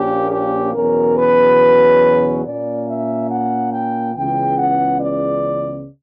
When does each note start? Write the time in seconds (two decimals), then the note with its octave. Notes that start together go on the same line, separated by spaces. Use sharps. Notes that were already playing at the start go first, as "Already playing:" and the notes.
Already playing: A#1 A#2 A#3 C#4 G4
0.31 G4
0.74 E2 B2 F#3 C#4 A#4
1.17 B4
2.45 A#2 A#3 C#4 D5
2.88 E5
3.31 F#5
3.72 G5
4.15 C#2 C#3 E3 B3 G5
4.57 F#5
5.00 D5